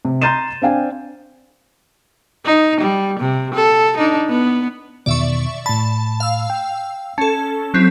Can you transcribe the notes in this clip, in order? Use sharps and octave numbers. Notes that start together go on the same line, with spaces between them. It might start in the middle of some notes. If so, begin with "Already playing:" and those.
C3
A#5 C6 G6 A6 D#7 E7
C4 D4 F5 G5 G#5
D#4
G3
C3
A4
D4 D#4
B3
E2 B2 D#3 D5 E5 C#6
A2 A5 B5
F5 E6
G5
C#4 A4 A5
F#3 C4 E4